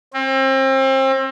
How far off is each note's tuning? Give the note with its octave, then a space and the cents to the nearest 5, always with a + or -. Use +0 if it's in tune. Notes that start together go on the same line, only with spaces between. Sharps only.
C4 +35